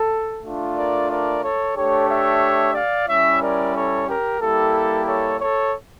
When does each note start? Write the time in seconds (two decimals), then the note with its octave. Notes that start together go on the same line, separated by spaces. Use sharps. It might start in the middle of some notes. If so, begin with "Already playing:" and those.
Already playing: A4
0.43 A3 D4 F4
0.76 A#4 D5
1.09 A#4 D5
1.43 A4 C#5
1.75 A3 D4 G4 A4 C#5
2.09 C#5 E5
2.74 D5 F5
3.07 G3 C#4 E4 C#5 E5
3.41 A#4 D5
3.74 A4 C#5
4.07 G4 A#4
4.40 G3 A#3 E4 G4 A4
5.06 A4 C#5
5.39 A4 C#5